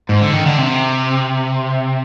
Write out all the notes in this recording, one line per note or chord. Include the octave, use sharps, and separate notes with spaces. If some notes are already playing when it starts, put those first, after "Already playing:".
G#2
D3
D#3
D3
C3